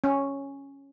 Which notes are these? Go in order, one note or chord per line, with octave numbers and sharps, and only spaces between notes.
C#4